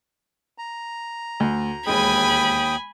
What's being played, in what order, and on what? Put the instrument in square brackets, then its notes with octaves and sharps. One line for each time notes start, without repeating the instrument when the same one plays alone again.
[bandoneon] A#5
[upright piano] D2
[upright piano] E1 G#3 [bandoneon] D#2 G5 D#6 [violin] G#5 B5